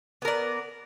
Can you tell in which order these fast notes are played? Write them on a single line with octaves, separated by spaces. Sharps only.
B3 A#4 D5